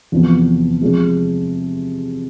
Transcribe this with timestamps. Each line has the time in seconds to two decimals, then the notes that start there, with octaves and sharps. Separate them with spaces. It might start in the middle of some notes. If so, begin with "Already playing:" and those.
0.12 E2 C3 F3 B3
0.81 C3 F3 G#3